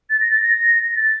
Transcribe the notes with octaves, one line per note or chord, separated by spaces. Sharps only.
A6
A#6
A6
A#6
A6